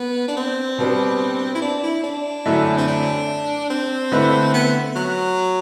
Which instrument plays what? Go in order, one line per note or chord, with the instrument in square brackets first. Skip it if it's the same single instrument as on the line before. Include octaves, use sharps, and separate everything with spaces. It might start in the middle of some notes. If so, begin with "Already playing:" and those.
Already playing: [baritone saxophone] B3
D4
C4
[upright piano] B2 G3 B3 D4
[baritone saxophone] E4
D4
E4
D4
[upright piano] F#2 D3 A3 E4
[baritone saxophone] C4
D4
C4
[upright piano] D3 A3 E4 B4
[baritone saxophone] B3
F#3